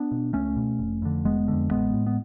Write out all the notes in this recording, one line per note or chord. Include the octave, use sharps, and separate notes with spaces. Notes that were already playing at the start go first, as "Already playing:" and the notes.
Already playing: B3 D4
B2
C#2 A3 C#4
B2
F1
F2 D3
F1 G#3 B3
F2 D3
A1 G#3 B3
A2
B3